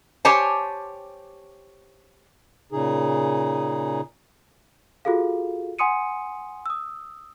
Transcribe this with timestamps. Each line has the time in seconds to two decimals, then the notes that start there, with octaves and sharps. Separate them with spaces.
0.25 G4 C5 C#5 G#5 A5
2.72 A#2 C#3 D#4 G#4
5.05 F4 F#4 G#4 A4 F5
5.79 F#5 G#5 C6 D#6 C#7 D#7
6.66 D#6 E6